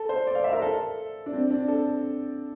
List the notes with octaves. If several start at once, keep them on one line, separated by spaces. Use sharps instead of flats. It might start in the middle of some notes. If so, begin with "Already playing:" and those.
Already playing: A4
C5
D5
F5
E5
A#4
A4
D4
C4
D4
A4